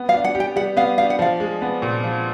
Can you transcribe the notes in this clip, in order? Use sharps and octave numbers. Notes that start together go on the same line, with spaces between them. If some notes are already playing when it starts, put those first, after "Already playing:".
Already playing: B3
F5
D4
F#5
G4
G5
G3 F#5
B3 F5
D4 F5
F#5
F3 F5
G#3
B3
A#2
F3